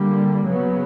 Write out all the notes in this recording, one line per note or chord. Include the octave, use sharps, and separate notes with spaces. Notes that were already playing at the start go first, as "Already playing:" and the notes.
Already playing: D3 G3 A#3
C#3 F#3 B3